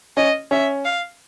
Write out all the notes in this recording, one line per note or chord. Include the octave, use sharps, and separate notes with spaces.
C#4 D#5
C#4 E5
F5